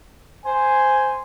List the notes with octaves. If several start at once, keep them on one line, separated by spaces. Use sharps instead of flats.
C5 G#5